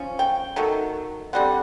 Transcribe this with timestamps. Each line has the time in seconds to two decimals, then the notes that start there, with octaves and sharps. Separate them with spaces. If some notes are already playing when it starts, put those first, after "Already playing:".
Already playing: F3 C#4
0.19 G5
0.56 D#3 F#3 A3
1.33 D3 G3 C4 F#5